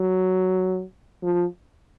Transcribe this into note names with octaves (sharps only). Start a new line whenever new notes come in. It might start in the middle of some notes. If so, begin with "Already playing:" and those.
Already playing: F#3
F3